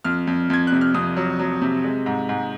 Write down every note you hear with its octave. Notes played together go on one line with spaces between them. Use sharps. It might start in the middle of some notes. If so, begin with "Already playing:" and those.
F2 F6
F2
F2 G#6
C3 F#6
F6
F2 D#6
F#3
F#3
C3
G#3
G#2
G#2